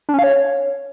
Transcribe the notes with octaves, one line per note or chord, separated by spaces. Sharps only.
D4
C#4
F5
C#5